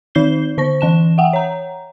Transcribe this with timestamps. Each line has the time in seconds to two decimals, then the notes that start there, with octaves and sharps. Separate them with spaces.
0.15 D#3 D#4 G6 C7 G7
0.58 D3 C5 C#6 A#6
0.81 E3 A5 E7
1.18 E5 F#5 G5
1.33 C#5 A#5